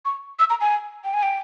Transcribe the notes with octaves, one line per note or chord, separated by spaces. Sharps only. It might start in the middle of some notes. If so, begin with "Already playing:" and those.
C#6
E6
A#5
G#5
G5
G#5
G5